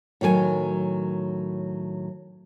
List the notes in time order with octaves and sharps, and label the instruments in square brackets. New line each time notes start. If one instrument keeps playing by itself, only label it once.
[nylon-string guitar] A2 D#3 F#3 C5 G#5